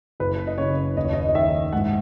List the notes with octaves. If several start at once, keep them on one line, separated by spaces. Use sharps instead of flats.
F#1 B4
D#5
C#3 C#5
D#2 D#5
C#5
D#5
D#5
D#3 E5
G#2 F#5